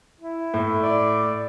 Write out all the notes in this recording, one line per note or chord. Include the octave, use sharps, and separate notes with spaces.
E4
A2
D5